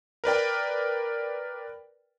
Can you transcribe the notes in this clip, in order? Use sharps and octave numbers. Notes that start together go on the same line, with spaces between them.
A#4 B4 D5 G5